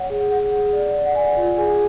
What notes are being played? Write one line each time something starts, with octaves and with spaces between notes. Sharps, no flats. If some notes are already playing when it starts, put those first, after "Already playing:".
Already playing: C#5 F#5
G#4
G#4 F#5
G#4
D5
D5
F#5
D5 G#5
F4
G#4 G#5